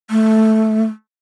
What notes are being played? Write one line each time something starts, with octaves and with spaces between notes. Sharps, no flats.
A3